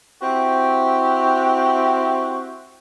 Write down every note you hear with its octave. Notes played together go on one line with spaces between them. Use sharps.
C4 E4 F#4 G4